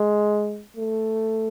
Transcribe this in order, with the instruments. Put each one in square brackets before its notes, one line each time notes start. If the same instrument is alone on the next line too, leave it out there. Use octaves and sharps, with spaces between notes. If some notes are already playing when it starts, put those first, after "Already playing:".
Already playing: [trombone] G#3
A3